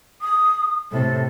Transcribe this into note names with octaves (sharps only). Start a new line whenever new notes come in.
D#6
A2 C3 A4